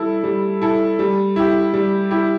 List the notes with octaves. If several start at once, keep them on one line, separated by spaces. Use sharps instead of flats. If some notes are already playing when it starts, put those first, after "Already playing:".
Already playing: G3 E4 A4
G3
E4 A4
G3
E4 G4
G3
E4 G4